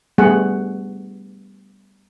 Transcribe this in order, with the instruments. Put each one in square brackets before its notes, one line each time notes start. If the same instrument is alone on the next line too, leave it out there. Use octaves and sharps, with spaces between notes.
[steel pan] G3 A3 B3 G#4 F#5